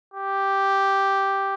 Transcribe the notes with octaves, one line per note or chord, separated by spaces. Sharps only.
G4